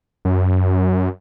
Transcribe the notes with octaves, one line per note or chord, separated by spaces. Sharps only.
F#2